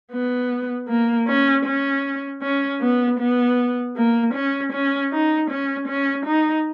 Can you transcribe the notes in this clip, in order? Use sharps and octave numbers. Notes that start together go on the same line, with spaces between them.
B3
A#3
C#4
C#4
C#4
B3
B3
A#3
C#4
C#4
D#4
C#4
C#4
D#4